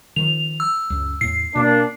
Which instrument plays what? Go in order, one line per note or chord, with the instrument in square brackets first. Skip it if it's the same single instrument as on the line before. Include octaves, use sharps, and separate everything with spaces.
[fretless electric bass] D#3 F3 [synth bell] F7
[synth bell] E6
[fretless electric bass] C#2 F#2
[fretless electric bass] E2 A2 [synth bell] C7
[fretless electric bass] B2 [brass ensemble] A#3 D4